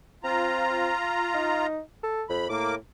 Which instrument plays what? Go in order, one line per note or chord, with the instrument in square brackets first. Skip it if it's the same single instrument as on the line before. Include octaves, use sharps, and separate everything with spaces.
[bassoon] C4 [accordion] F4 A#5
[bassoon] D#4
A4
[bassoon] F2 [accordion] B5
[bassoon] A2 [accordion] A#3 D6